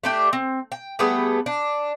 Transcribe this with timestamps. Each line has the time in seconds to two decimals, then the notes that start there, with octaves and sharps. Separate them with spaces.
0.04 A3 D4 G4
0.33 C4
0.72 G5
0.99 G3 A3 B3 G#4
1.46 D4